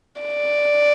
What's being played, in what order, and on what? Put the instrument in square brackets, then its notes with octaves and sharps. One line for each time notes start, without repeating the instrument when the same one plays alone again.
[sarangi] D5